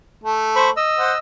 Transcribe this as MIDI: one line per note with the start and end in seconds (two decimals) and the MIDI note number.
0.24 0.69 57
0.56 0.70 72
0.56 0.70 83
0.56 0.70 85
0.77 1.18 75
0.77 1.18 88
0.98 1.12 72
0.98 1.12 78